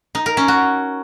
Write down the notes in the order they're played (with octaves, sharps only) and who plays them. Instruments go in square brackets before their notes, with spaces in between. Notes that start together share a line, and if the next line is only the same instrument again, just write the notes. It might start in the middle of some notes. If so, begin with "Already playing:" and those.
[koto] D#4
A#4
C#4
F#4